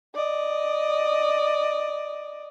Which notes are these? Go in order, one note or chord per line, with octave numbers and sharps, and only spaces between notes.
D5 D#5